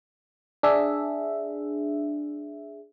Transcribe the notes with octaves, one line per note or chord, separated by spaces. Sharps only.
D4 G#4 E5